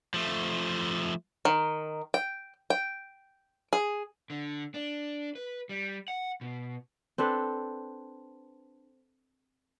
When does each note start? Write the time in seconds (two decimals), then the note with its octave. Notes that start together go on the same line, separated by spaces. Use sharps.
0.14 F3 A3
1.45 D#3
2.14 G5
2.70 G5
3.73 G#4
4.30 D3
4.74 D4
5.35 B4
5.69 G3
6.08 F#5
6.41 B2
7.18 C4 D4 A4 B4